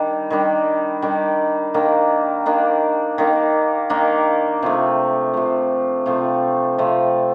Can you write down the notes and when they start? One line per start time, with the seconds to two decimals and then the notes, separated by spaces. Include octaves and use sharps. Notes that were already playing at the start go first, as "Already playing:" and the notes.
Already playing: D#3 G3 D4
0.30 D#3 G3 D4
1.02 D#3 G3 D4
1.74 D#3 A#3 D4
2.46 D#3 A#3 D4
3.18 D#3 A#3 D4
3.90 D#3 A#3 D4
4.63 C3 F3 A3
5.34 C3 F3 A3
6.06 C3 F3 A3
6.78 C3 F3 A3